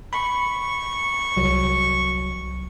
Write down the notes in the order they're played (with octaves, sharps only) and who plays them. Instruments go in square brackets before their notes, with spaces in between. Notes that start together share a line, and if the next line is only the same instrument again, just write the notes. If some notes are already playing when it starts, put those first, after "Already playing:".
[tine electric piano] B5 [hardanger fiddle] C#6
[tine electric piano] C2 F#3